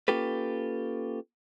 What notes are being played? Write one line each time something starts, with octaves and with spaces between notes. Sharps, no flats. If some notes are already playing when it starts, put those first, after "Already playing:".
A#3 C#4 F4 G4 A4 B4